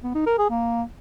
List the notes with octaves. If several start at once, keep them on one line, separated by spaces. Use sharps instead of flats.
B3
D#4
A#4
G#4
A#3